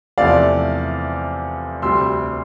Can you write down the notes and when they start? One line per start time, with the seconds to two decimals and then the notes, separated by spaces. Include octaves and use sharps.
0.18 E2 C3 F3 A3 D5 F5
1.82 D2 C3 G3 C6 E6